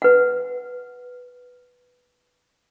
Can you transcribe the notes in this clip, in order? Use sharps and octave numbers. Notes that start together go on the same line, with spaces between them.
B4 F#5